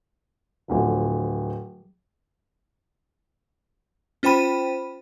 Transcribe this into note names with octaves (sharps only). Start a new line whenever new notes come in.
D1 D3 F3
C#4 F4 C5 G5 B5 D#7